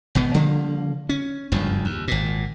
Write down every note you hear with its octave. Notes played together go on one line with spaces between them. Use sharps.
G#1 B2 B3
C#3 F3 G3 A#3
C#4
F#1 D2 G2 F3
D#2
G#1 A#2